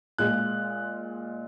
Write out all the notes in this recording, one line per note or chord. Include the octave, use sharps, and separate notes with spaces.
A#2 G#3 F#6